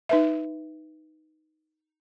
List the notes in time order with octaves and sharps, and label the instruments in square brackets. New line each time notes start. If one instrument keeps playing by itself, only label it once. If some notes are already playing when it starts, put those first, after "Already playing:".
[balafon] D#4 B4 E5